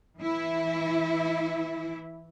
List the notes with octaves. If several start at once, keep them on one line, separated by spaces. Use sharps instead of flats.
E3 E4